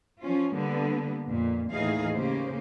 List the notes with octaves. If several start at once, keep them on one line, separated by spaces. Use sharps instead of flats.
F3 C#4 F4
D3 G3 A#3 B3
F2 A#2
D#2 A2 E3 D#4 G#4 F5
C#3 A#3 G4 C5